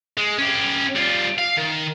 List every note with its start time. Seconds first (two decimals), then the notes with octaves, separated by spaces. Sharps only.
0.17 G#3
0.38 C#4 G4
0.95 G3 F4
1.38 F5
1.57 D#3